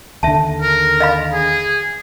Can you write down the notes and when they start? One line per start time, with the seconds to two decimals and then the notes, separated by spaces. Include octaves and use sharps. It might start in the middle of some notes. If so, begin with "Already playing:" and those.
0.23 D#2 D3 E5 A5
0.62 A#4
1.00 D#5 F5 B5
1.33 G#4